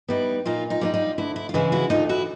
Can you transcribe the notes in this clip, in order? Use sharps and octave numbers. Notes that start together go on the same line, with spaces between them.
G3 B3 D#4 E4
A#2 D#4 F4
D#4 F4
G3 B3 D#4
D#4 F4
D2 E4
E4
F4
C#3 E3 G#3 E4
E4 F#4
D2 D#4 F4
E4 F#4